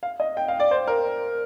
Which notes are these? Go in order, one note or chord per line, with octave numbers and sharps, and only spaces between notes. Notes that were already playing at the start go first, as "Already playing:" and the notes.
F5
D#5
G5
F5
D5
C5
A#4